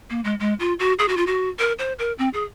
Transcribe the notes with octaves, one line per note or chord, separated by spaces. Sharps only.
A#3
G#3
G#3
F4
F#4
G#4
F#4
F4
F#4
A#4
C5
A#4
C4
G#4